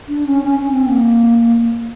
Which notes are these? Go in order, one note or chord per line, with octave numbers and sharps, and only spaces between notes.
D4
C#4
C#4
C#4
C4
B3
A#3